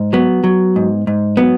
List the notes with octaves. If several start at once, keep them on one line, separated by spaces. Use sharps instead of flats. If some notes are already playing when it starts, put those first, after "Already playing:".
Already playing: G#2
F#3 B3
F#3
G#2
G#2
F#3 B3